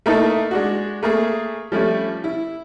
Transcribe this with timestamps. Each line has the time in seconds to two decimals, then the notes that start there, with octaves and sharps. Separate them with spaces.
0.06 A3 A#3 D#4 E4 A4
0.51 G#3 D4 F#4
1.03 A3 A#3 G#4
1.72 F3 G3 A3 C#4
2.24 E4